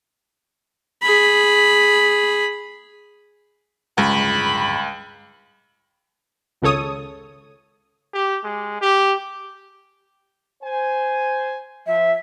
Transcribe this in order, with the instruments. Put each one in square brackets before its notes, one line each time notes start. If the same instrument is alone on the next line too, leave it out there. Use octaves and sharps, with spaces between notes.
[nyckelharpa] G#4 B5
[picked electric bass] D1 G2 G#3 [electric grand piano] C#2 [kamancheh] B5
[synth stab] G#1 C#2 C#3 A4 C#5 D#6
[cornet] G4
G#3
G4
[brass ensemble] C5 G#5
[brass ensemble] F3 [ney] E5